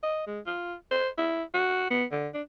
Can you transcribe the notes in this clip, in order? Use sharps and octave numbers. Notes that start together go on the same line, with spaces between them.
D#5
G#3
F4
C5
E4
F#4
B3
D3
D4